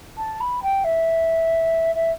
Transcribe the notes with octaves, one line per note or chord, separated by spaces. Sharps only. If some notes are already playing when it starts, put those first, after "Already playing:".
A5
B5
G5
E5
E5